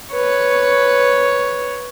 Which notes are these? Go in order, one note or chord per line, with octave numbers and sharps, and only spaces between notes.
B4 C#5